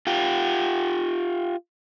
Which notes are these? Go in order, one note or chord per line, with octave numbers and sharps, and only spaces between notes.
F4 G4